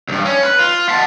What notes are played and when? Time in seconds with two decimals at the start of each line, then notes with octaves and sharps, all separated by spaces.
0.09 C2 G2
0.25 C#4
0.43 B4
0.59 F4
0.89 B3 A5